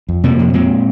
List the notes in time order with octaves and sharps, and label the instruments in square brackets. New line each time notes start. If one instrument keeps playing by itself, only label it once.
[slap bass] F2
C3 F3 A#3
F2
A#2 G#3 C4